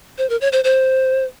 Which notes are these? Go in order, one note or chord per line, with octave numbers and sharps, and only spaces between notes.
C5
A#4
C#5
C5
C5